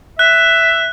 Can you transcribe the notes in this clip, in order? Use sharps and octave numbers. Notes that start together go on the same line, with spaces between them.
E5 F#6